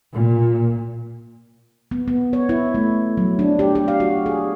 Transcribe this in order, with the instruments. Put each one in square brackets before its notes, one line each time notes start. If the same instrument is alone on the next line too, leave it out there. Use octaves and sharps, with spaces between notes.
[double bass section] A#2
[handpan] B3
B3
C#5
E4
A3
F#3
D4
G4
G4
F5
F#4
G#4